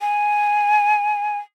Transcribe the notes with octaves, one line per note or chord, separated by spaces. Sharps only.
G#5